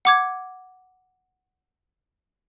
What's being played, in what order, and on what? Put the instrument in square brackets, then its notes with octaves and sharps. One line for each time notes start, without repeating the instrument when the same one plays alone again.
[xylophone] F#5 D6 G#6